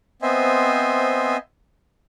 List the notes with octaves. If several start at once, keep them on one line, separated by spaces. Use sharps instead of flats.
B3 C4 C5 D#5 E5 G#5